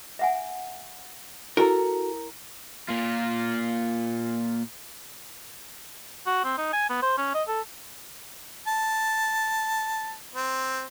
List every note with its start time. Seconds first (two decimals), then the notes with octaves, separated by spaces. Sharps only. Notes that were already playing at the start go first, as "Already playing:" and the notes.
0.19 E5 F#5 G#5
1.57 E4 F#4 A4 A#4
2.88 A#2 F4
6.26 F#4
6.44 C4
6.58 D#4
6.73 G#5
6.89 B3
7.02 C5
7.17 C#4
7.34 D#5
7.48 A4
8.67 A5
10.35 C4